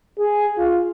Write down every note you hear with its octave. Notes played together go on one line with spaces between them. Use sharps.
G#4
F4